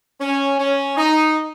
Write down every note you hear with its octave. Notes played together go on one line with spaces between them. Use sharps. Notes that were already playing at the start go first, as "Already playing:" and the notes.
C#4
C#4
D#4